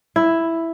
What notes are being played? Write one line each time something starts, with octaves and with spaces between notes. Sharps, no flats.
E4